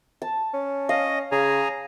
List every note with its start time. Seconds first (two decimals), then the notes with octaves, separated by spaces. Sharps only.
0.22 A5
0.54 C#4
0.89 D#5 F5
1.32 C#3 G#4 G#5 A#5